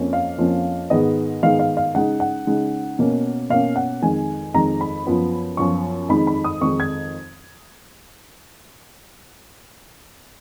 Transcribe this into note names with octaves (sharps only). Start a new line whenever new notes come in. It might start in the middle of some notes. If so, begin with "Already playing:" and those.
Already playing: F2 F3 A#3 C#4
F5
F2 F3 A#3 C#4
G#2 D#3 G#3 B3 D#5
G#2 D#3 G#3 B3 F5
F5
F5
C#3 G#3 D#4 F#5
F#5
C#3 G#3 D#4
B2 A#3 C#4
B2 A#3 C#4 F5
F#5
F2 D#3 G#3 G#5
F2 D#3 G#3 A#5
B5
F#2 F3 B3 F4
F#2 F3 B3 F4 C#6
F2 D#3 G#3 D#4 B5
B5
D#6
F2 D#3 G#3 D#4 C#6
G#6